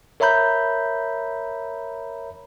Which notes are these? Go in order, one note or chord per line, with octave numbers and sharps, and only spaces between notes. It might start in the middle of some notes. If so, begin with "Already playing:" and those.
A#4 C#5 E5 A#5 B5 G6